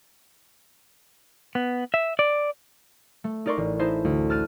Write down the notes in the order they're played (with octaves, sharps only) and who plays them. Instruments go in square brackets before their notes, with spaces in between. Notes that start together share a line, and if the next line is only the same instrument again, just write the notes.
[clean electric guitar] B3
E5
D5
[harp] A3
D#4 A#4 D5 C6 C#6
A1
D#4 E4 C5 E5 A5 C6
D2
A5 F6 F#6 A6 D#7